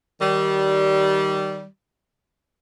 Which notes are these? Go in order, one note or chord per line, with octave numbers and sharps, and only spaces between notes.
D#3 G3